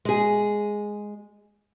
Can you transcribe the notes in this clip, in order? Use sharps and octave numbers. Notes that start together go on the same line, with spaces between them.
G#3 G#4